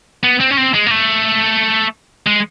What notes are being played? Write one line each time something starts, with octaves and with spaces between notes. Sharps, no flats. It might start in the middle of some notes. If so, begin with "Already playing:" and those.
B3
C4
C#4
C4
G#3
A#3
A3
G#3